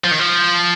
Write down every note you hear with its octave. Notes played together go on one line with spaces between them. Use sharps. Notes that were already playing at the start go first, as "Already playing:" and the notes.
F3
D#3
F3